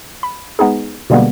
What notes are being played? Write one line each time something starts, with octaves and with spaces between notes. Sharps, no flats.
B5
G#3 B3 D#4 G#4
B2 D3 G3 G#3 A#3 B3